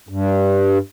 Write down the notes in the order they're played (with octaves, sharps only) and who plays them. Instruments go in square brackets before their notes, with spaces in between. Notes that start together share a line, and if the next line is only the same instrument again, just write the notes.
[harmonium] G2